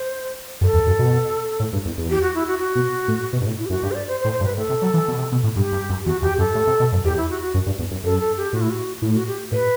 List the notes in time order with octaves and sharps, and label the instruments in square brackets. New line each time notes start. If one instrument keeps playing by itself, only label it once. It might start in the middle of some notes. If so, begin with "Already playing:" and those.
Already playing: [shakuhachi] C5
[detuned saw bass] F#2 [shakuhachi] A4
[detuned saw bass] E2
F#2
B2
A2
G2
E2
E2
[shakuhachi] G4
F#4
E4
F#4
F#4
[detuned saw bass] B2
A2
B2
G2
A2
[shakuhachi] E4
G4
[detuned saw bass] F#2 [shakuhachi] F#4
[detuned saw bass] G2 [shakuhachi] G4
[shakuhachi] C5
D5
C5
C5
[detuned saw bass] A2
[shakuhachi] C5
[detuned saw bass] G2
[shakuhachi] B4
[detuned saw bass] A2 [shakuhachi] A4
[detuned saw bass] C3
F#3
E3
B2
C3
B2
A2
[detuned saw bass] G2 [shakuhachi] G4
[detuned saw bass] G2
F#2
[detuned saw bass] E2 [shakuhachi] F#4
[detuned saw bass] E2 [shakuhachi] G4
[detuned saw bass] F#2 [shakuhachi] A4
[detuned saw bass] A2
C3
B2
F#2
[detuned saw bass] E2 [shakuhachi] G4
[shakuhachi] E4
F#4
F#4
[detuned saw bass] F#2
G2
E2
F#2
[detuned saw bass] F#2 [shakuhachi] A4
[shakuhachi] A4
G4
[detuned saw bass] A2 [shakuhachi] F#4
[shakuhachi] E4
F#4
[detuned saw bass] A2 [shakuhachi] E4
[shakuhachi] F#4
G4
[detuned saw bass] A2 [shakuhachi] B4